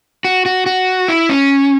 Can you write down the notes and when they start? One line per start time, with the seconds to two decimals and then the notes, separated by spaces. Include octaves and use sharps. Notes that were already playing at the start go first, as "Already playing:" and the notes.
0.25 F#4
0.46 F#4
0.66 F#4
1.08 E4
1.29 C#4